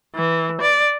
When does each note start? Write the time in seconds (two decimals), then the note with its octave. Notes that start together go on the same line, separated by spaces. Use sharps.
0.15 E3
0.61 D5